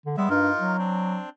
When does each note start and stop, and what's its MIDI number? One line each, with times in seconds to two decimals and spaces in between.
0.06 0.16 50
0.17 0.27 55
0.17 0.29 56
0.17 0.29 59
0.17 0.29 76
0.30 0.50 43
0.30 0.77 63
0.30 0.77 65
0.30 0.77 70
0.59 1.19 54
0.78 1.29 60
0.78 1.29 62